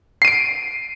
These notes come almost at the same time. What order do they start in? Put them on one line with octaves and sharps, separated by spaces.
C7 D#7 D7